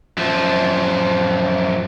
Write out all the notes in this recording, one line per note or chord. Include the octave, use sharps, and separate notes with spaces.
F#2 F3